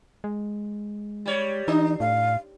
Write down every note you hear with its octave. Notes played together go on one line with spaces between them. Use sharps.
G#3
G3 C#5
E3 D4 D#4
A2 F5